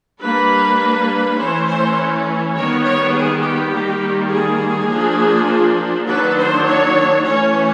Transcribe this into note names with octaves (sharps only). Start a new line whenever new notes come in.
G3 A#3 D4 B4
E3 A3 C#4 C5
C5
D#3 G3 B3 C#5
C#5
G#4
G4
D#3 G3 A#3
G#4
F3 A#3 D4
D#3 F#3 A#3 D4 B4
C5
C#5
E3 A3 C#4 C#5